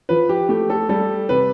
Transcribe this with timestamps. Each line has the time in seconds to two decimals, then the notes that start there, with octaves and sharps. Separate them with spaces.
0.09 F3 B4
0.29 G4
0.49 A3 G4
0.70 A4
0.89 G3 A4
1.29 C3 B4